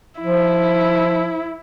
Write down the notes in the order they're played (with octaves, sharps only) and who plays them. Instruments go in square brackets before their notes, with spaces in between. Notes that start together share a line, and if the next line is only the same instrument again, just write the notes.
[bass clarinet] F3 [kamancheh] E4